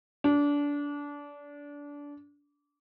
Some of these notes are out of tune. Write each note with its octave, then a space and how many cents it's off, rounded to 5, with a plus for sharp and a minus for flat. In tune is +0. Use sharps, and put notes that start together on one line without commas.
D4 -25